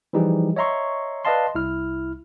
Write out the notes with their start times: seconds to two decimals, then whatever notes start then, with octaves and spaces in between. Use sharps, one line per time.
0.13 E3 F3 G3 D#4 G4 G#4
0.56 C#5 D#5 E5 A#5 C6 C#6
1.25 B4 D5 D#5 F5 A5 C6
1.55 C2 E4 F6